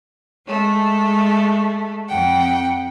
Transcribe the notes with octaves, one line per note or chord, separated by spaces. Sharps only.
G#3 A3
F2 F#5 G5